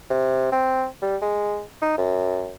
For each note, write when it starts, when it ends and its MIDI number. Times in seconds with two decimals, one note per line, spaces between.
0.10 0.48 48
0.52 0.85 60
1.02 1.17 55
1.22 1.62 56
1.82 1.94 63
1.98 2.53 42